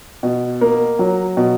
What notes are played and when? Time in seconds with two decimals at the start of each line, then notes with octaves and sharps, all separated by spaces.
0.23 B2
0.61 A#3
0.99 F#3
1.37 B2